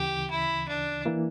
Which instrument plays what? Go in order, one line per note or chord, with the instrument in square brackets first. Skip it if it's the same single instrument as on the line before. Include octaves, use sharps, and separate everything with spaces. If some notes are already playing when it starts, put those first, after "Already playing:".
Already playing: [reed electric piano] D2 C#3 E3 [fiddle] G4
[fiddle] E4
D4
[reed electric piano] E3 A#3 E4